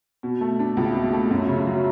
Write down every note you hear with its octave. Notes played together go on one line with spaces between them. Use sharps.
B2
A3
D4
C#2
B2
A3
F#2
C#3
F#3